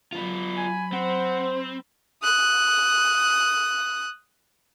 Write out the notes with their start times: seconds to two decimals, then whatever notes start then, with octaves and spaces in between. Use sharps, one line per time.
0.13 F#3 B3 F4 B5
0.57 G#5
0.93 C4 C5 F#5
2.23 D#6 F#6